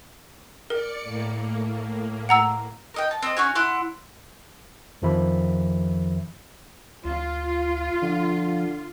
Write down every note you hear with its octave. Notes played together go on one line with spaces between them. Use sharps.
A#4 D5 C#7
A2 A#3
F#5 A#5 E6
A#4 D#5 G5
A5
C4 D#5
C#4 F#4 G#5
E4 F#5 C6
F2 D#3 F3 A#4 E5 B5
D2 F4
D3 F3